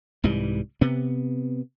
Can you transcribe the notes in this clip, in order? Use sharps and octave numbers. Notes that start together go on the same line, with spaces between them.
C2 G#2 E3 G3
C3 B3